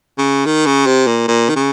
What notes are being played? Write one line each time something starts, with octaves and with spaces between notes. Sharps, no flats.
C#3
D#3
C#3
C3
A#2
A#2
D#3
C#3